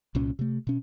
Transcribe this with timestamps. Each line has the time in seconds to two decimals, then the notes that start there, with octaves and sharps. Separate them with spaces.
0.15 C2 A#2 C#4
0.39 C3 A3
0.67 B2 C#4